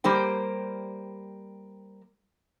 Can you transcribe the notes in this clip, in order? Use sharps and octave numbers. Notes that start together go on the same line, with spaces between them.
G3 A#3 G4 C5 G5